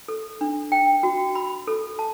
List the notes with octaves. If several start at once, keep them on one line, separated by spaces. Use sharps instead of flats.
A4
D4
G5
F#4
B5
A4
A5